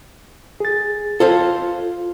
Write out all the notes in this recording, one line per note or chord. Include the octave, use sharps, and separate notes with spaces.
G#4 A6
F4 A4 C5 F5